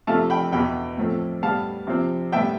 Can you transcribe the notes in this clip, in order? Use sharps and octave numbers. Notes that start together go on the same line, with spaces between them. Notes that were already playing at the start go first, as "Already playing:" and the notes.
C3 F3 A3 F5 A5
G5 B5
E2 B2 B3 G5 B5
A2 F3 A3 C4
A2 G3 B3 F5 A5
C3 F3 C4
A2 G3 B3 E5 G5